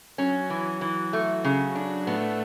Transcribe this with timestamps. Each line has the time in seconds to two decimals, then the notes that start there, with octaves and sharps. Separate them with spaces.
0.18 F#3 C#4
0.50 E3
0.81 E3
1.13 A3
1.44 C#3
1.75 D4
2.06 A2 A3 B3